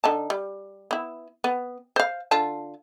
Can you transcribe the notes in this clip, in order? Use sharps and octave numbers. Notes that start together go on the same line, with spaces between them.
D3 D#4 A5
G3
B3 E4
B3
C5 F5
D3 F4 A5